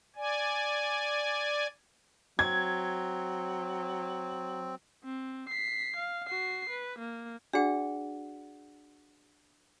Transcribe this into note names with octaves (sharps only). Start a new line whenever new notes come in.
D5 G#5
F#3 C4 G#6
C4
B6 C7
F5
F#4 C7
B4
A#3
D4 F#4 G#4 D5 F#5